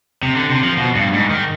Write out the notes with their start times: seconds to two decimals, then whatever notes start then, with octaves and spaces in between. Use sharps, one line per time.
0.23 C3
0.36 D3
0.50 C3
0.63 F3
0.77 B2
0.95 G2
1.13 G#2
1.31 D#3